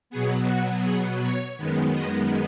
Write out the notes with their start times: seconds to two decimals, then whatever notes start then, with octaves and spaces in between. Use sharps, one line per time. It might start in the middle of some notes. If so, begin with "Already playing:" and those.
0.10 B2 F#3 B3 G#4
0.47 F#4
0.83 G#4
1.20 C#5
1.57 F#2 D#3 G#3 B3
1.93 D#5